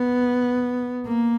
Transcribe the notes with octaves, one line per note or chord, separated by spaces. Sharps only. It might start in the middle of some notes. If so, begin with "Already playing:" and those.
Already playing: B3
A#3